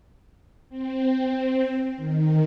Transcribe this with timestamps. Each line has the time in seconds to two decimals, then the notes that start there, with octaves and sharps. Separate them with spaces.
0.69 C4
1.96 D#3